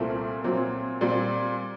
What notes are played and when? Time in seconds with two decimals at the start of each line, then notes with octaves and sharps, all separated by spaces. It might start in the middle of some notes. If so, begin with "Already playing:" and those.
Already playing: C2 A#2 A3 C4 A#4
0.44 A#2 F#3 C4
1.01 A#2 G3 C4 D5